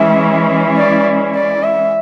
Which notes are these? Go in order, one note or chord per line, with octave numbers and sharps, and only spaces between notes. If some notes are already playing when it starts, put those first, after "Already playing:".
Already playing: E3 G#3 C#4 E4 E5
D5
D5
E5